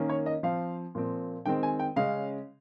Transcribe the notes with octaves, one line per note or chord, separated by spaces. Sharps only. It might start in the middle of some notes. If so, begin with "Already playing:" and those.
Already playing: D#3 A#3 C#4
C#5
D#5
F3 C4 F5
A#2 F3 C4
D#3 G#3 C4 G5
G#5
G5
C#3 G#3 C#4 F5